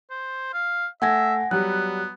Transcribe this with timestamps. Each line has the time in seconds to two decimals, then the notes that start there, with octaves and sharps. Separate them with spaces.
0.10 C5
0.53 F5
1.02 A3 E5 F#5 G#5 G#6 A#6
1.51 F#3 G3 B3 F#6